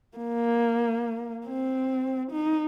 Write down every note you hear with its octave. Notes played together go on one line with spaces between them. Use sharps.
A#3
C4
D#4